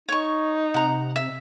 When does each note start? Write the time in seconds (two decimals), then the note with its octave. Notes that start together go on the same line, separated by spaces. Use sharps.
0.09 D#4 C#5 C#6
0.74 C3 F#5 A#5
1.16 E5